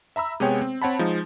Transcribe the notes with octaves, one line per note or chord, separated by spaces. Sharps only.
E5 A#5 B5 E6
C3 G#3 B3 G#4 C#5 G5
C4
C4 C#5 F#5 A5 B5
F3 G#3 D#4